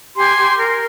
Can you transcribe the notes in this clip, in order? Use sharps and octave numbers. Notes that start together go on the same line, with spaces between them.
G4 G#5 C6
G4
A#4